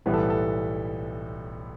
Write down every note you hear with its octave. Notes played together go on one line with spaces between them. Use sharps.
B1 A2 E3 G3 B3 B4
A4
A4